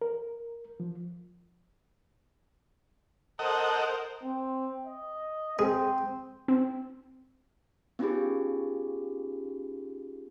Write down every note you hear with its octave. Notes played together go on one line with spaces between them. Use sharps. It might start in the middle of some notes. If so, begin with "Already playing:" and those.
A#4
F3
A4 A#4 C5 D#5 F#5
C4
D#5
C4 G#4
C4
B3 C#4 D#4 F4 G4 G#4